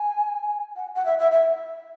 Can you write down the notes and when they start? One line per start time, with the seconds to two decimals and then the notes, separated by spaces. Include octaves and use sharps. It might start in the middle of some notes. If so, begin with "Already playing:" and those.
Already playing: G#5
0.76 F#5
0.96 F#5
1.05 E5
1.19 E5
1.32 E5